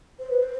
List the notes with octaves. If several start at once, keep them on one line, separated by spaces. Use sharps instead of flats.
C5
B4
C5